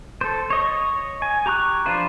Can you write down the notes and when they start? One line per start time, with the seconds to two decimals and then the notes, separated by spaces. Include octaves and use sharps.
0.21 A4 C5
0.50 C#5 D#5 C#6
1.22 G#5
1.46 G4 A#5 C#6 F#6
1.86 F3 D4 F4 B4 C5